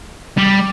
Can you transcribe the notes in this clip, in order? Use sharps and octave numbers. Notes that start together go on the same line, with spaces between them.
G3